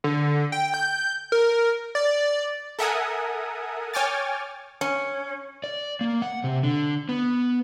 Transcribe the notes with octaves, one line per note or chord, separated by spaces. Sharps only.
D3
G5
G6
A#4
D5
A4 A#4 E5 F#5 G#5 D#6
C#5 G5 G#5 D6 F6 A6
C#4
D5
A#3
F#5
C3
D3
B3